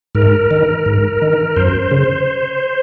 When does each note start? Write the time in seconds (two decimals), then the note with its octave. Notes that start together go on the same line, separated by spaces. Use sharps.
0.15 G#2 A#4
0.51 D#3
0.86 G#2
1.22 D#3
1.56 F#2 C5
1.91 C#3